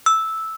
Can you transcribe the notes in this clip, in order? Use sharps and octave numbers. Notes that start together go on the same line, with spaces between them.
E6